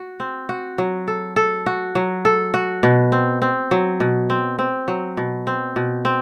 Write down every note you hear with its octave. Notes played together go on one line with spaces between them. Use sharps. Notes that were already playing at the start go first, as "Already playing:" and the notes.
Already playing: F#4
C4
F#4
F#3
A4
A4
F#4
F#3
A4
F#4
B2
C4
C4
F#3
B2
C4
C4
F#3
B2
C4
B2
C4